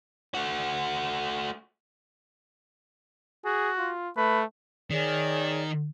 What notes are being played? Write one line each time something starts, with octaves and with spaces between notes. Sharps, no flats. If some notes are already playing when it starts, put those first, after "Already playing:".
A3 F#4
F#4 G#4
F4
A3 B4
D#3 G#4 C#5 D5